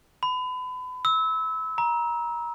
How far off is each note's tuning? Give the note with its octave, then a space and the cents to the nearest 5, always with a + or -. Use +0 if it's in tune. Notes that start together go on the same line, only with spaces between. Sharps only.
B5 +30
E6 -25
A#5 +25